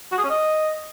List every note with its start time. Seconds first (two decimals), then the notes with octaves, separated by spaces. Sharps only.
0.12 F#4
0.18 G#4
0.24 C#4
0.30 D#5